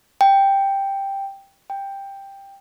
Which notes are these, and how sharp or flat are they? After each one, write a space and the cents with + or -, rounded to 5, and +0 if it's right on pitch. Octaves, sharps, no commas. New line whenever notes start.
G5 +5
G5 +10